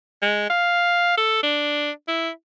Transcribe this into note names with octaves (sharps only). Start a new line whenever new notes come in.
G#3
F5
A4
D4
E4